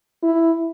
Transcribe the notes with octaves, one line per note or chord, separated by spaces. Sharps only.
E4